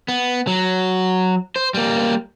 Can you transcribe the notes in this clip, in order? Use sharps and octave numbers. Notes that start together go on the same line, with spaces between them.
B3
F#3
C5
G3 A#3